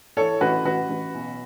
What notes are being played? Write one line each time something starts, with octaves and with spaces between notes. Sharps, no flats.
E3 A4 C#5
A1 F#4 B4
A1 F#4 B4
A1
B1